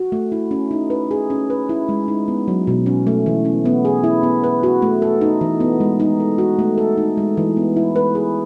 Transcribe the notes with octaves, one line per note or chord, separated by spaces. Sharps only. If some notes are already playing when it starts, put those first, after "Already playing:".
Already playing: F#4
A3
E4
C#4
D#4
B4
G#4
C#4
B4
E4
G#3
D#4
B3
F#3
B2
C#4
A3
E3
C#4
B3
G#4
E4
B3
B4
F#4
A3
A4
D#4
E3
B3
G#3
D#4
A4
F#4
A3
A4
D#4
G#3
E3
B3
E4
B4
G#4